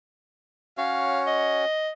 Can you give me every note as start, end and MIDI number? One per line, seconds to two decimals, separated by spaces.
0.78 1.65 61
0.78 1.65 66
0.78 1.65 73
0.78 1.21 77
1.26 1.90 75